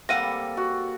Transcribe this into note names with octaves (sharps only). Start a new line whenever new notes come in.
G3 A#3 C4 A4 F5 F#5 A#6 D#7
F#4